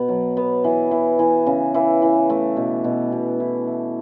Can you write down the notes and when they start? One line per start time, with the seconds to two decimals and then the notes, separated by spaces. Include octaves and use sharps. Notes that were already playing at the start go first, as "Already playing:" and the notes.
Already playing: B2 B3
0.09 F#3
0.37 B3
0.64 E3
0.91 E3
1.19 E3
1.47 C#3
1.74 E3
2.02 E3
2.30 A3
2.57 B2
2.84 B2
3.12 B2
3.40 E4
3.67 E4